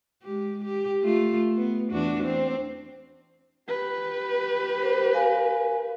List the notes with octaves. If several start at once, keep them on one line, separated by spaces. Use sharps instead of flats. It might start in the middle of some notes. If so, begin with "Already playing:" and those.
G#3 G4
G4
A3 F4
B3
E2 D4 F#4
C4 D4
G4 B4
A#4 C5
A#4 F5 G#5